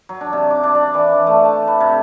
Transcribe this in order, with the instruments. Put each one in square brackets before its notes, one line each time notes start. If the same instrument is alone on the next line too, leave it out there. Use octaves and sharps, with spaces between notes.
[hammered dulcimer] F#3
D4
C3
D6
D4
D5
E3
D4
A3
A5
B4
C3